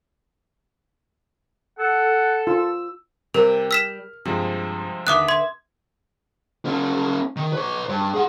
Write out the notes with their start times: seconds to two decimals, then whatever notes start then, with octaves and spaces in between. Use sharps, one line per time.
1.79 A4 F#5
2.47 F4 E6
3.34 C3 G3 G4 A#4
3.71 E6 F6 B6 E7
4.25 G2 C3 F3 G#3
5.07 D#2 D3 B4 E5 D6 D#6 F#6
5.28 C6 G#6
6.65 A#3 C#4
7.36 D#3
7.53 B4 C#5
7.89 G2
8.14 G#4 F#5